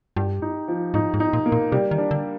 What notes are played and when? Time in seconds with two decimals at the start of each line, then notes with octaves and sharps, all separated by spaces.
0.16 G2 G4
0.42 D#4
0.68 F3
0.94 G#2 D#4
1.14 G#2
1.20 D#4
1.33 A#2
1.46 A#3
1.52 A#2
1.72 C3 G3
1.91 D#3
1.98 D4
2.11 D3